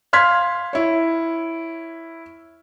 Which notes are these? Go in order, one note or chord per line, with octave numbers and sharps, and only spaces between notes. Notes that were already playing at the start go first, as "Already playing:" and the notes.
F5 C6 F6 G#6 B6
E4 C#5